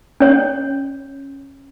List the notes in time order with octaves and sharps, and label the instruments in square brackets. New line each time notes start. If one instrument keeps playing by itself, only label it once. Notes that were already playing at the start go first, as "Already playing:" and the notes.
[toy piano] C#4 C#5